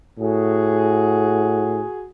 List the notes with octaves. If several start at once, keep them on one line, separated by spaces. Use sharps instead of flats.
A2 F#4 G#4